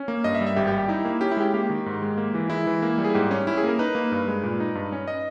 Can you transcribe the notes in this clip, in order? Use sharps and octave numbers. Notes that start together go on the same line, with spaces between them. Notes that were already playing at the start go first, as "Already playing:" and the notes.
Already playing: C#4
A#3
G2 D#5
E5
G3
E5
G#1 G4
G4
G3
G4
D#4 E4
A#3
C#4 G4
E4
G#3 G4
A#3 G4
D#3
G#2
G#3
A#3
E3
G#3 E4
E3
A#3
G3
G#4
G#2 G4
C#4
C#4 E4
G#4
A#3 A#4
D#4 B4
A#3
G2
G#3
A#2
D#4
G2
C#4
D#5